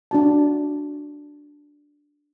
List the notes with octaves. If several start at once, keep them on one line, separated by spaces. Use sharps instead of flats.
D4 F#4 A5